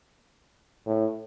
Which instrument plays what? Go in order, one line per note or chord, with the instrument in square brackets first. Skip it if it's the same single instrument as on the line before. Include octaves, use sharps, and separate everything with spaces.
[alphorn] A2